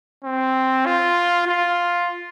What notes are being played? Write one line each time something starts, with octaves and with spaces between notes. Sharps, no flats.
C4
F4
F4